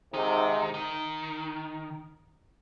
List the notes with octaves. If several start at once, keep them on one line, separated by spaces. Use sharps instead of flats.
G#2 C3 D#3
D#3